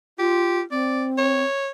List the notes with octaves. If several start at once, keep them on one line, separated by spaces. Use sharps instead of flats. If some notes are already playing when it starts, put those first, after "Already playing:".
F4 G4
C4 D5
C#5